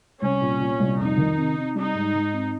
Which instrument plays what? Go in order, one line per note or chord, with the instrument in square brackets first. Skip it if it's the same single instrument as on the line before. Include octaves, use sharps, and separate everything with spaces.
[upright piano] C2 [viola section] C#4
[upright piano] A#2
A#2
C2
[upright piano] F2 [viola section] D#4
[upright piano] D#3
C3
C3
[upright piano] G3 [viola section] D#4
[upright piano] G#2
G#2
C4